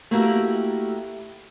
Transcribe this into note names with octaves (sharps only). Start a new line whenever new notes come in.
A3 A#3 E4 F#4 G4 A#4